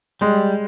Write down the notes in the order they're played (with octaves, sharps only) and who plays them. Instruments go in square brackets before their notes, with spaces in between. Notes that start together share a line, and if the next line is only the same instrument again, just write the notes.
[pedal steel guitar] G3 [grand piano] G#3